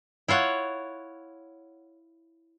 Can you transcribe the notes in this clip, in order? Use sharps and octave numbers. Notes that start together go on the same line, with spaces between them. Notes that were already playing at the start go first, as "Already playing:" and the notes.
E4 F4 C#5 F#5